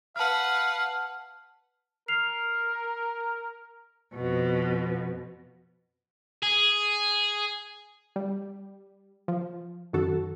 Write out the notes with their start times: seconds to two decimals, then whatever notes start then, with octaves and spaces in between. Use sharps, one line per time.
0.16 B4 F5 F#5 A5 F6
2.08 A#4 F6 C7 F7
4.14 F2 B2
6.43 G#4
8.16 G3
9.28 F3
9.93 F#2 D#3 F#4 A4